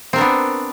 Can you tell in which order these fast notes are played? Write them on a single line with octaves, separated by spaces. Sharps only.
C4 A#4 D4 B3